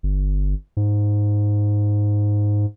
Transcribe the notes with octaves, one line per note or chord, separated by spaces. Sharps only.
G1
G#2